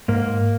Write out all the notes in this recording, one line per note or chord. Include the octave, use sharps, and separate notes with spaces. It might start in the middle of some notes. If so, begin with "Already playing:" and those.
G#2 A#3